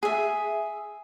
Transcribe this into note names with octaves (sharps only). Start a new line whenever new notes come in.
G#4 E5